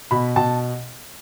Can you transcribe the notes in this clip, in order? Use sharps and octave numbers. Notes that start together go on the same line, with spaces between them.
B2 B5
B2 A5